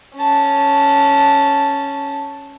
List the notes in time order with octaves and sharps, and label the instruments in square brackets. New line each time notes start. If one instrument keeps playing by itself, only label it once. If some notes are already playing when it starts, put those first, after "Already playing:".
[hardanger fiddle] C#4 A5